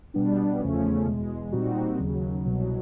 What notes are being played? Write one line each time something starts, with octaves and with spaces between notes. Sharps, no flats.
B2 G3 B3 D4
E2 C#3 F3 A3 C#4
E2 B2 G#3
A#2 G3 C4 D#4 F#4
D#2 C#3 F#3
C2 B2 F#3